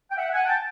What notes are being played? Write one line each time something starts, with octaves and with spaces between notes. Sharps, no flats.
G5
E5 F#5
F#5 G#5
G5 A5